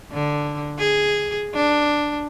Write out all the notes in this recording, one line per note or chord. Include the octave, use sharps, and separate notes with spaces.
D3
G#4
D4